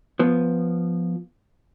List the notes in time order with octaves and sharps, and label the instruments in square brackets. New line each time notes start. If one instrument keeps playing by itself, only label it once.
[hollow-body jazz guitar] F3 B3